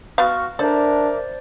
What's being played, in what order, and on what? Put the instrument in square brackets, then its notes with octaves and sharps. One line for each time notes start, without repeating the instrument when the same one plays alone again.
[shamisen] B3 F5 [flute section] F#4 C#6 F6
[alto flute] D4 [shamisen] A4 [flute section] A#4 E5 D6 [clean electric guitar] C5 D5